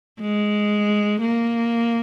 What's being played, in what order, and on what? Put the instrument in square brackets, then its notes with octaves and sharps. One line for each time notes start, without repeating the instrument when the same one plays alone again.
[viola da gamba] G#3
A#3